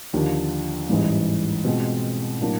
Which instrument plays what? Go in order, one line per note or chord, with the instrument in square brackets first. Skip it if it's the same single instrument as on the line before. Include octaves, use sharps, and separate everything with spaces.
[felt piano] D#2 D3 F3
A1 G#2 E3 G3
B2 G#3 C4 F4
A2 F#3 A#3 D4